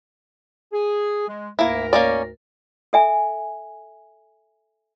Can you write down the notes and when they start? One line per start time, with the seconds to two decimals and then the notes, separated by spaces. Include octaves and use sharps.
0.73 G#4
1.28 G#3
1.59 D2 G#2 A#3 E4 A#4
1.93 A#3 C#4 D5
2.93 A4 E5 G#5